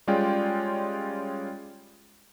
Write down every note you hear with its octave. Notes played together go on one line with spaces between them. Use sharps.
G3 G#3 C#4 F4 D5 G5